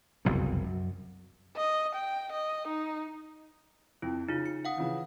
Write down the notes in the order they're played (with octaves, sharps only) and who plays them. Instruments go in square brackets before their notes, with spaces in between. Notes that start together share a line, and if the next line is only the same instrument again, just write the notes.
[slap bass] F#1 C2 F2 B2
F#2
[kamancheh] D#5
G5
D#5
D#4
[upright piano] F2 [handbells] E4
[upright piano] C#3 [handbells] D#4 F4
[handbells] C#7
F5 F#5 D#6
[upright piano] C#3 E3 F3